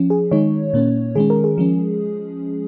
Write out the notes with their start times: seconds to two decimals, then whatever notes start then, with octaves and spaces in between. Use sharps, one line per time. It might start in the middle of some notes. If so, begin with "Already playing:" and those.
Already playing: F3 C#4
0.10 G#4
0.31 D#3 G#3 D#4 C#5
0.73 A#2 A#3 C#4
1.15 D#3 G#3 C#4 G#4
1.30 A#4
1.44 G#4
1.58 F3 G#3 C#4